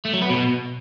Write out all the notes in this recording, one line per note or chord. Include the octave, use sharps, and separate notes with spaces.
A3
F#3
B3
B2